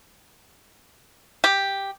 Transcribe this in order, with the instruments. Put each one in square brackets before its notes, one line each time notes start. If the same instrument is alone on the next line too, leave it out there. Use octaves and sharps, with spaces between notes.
[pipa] G4